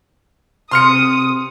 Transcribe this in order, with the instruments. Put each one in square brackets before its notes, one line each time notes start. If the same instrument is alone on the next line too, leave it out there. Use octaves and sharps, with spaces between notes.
[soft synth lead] C3 [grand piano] C6 F6 C#7 [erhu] D#6